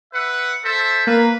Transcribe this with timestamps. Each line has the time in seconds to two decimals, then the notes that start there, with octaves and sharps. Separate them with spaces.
0.14 B4 E5 F#5
0.64 A4 C5 E5
1.07 A#3 B4